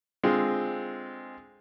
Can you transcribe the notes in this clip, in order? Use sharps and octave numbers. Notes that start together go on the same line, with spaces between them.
D3 G#3 C4 F4